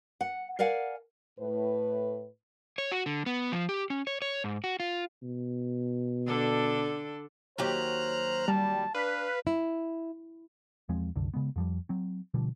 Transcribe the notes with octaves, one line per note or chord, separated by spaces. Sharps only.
F#5
A#4 D5 F5 F#5 G#5
A2 B4
C#5
F#4
D3
B3
F3
G4
C#4
C#5
C#5
G#2
F#4
F4
B2
D3 D4 A4
D#2 F#3 G4 C5 A#5 F6 F#6
G3 A5
D4 B4 F5
E4
E2 F3 G#3 C4
C2 F#2 D3
C#3 G#3 B3
F2 F3 G3
F#3 C4
B2 D3 F3 G3